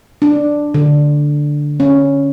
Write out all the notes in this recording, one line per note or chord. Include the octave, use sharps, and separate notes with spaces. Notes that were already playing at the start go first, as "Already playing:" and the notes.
D4
D3
C#4